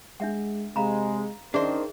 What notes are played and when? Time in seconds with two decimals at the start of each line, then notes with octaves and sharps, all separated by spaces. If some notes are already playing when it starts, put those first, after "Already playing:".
0.20 G#3 D4 E5 F#5
0.76 C3 G#3 F5 A#5 B5
1.54 D#3 C#4 D4 G#4 C5 D5 E5